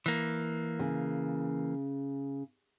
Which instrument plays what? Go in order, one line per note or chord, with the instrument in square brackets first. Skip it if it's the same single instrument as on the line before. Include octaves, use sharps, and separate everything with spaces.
[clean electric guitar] E3 A#3
[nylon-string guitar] C#3